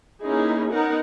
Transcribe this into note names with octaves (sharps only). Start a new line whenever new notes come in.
A#3 C#4 D#4 E4 G#4
B3 D#4 A#4 F#5